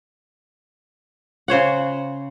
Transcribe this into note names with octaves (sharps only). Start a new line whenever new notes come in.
C#3 C5 C#5 F#5